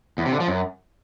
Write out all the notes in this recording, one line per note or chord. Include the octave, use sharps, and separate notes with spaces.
E2
C3
D3
F3
F#2